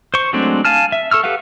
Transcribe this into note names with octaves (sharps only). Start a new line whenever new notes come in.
C5 C#6
F#3 G#3 A3 C4 D4
F5 G#5 A5 F6
E5
A4 C#6 E6 F6
G4 A4 B4 F5 F#5